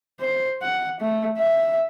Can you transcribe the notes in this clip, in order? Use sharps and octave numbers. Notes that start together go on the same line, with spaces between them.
C5
F#5
A3
E5